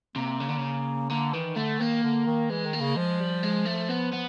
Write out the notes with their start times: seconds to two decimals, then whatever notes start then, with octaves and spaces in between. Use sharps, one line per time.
0.16 C3 A#3
0.40 C#3
0.49 D3
0.57 C#3
1.10 D3 A#3
1.33 D#3 E3
1.56 D3 A3
1.79 D#3 A#3
2.03 D3
2.26 D#3
2.50 E3 G#3
2.66 D#3
2.74 A#3
2.81 C#3
2.96 F3 G#3
3.20 G3
3.43 G#3
3.66 A3
3.89 B3
4.13 B3